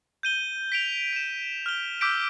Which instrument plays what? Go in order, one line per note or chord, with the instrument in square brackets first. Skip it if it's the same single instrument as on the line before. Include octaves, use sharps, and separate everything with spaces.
[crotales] G6 D#7 G7
B6 D7 F7
D7 E7
F6 G7
D6 E6 G6 B6 D7